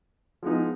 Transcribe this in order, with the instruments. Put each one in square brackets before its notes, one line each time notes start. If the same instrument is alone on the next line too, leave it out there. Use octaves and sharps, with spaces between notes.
[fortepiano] F3 G#3 B3 D#4